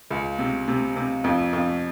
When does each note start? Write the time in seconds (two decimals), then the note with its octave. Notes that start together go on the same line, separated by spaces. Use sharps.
0.11 C#2
0.39 C3
0.68 C3
0.96 C3
1.24 F2
1.53 F2